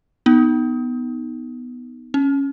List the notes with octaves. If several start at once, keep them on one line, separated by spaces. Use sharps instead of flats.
B3 D#4
C#4